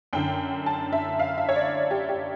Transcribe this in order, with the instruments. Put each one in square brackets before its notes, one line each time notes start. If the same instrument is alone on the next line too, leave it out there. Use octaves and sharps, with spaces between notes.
[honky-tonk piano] F#2 D3 G5
A5
E5
F5
E5
C#5
D5
G4
G4